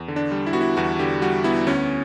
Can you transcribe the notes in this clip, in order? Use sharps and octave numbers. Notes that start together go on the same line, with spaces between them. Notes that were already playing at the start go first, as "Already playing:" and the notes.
Already playing: E2
D3
D4
G3
E4
B3 F#4
E4
E2 F#4
D3 G4
G3 F#4
B3 E4
D2 C#4